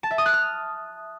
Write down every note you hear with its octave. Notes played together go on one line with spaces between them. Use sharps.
A5
E5
D#6
F#6
F6